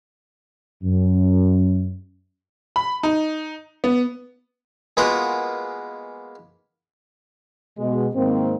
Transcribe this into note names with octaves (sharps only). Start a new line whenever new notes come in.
F#2
B5
D#4
B3
G#3 A#3 B3 F4 F#4 A#4
B2 G#3
G#2 D#3 A#3 C4